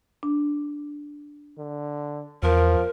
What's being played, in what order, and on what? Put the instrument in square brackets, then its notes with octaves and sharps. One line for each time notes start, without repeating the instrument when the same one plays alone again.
[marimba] D4
[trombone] D3
[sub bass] E2 [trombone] F3 [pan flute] A#4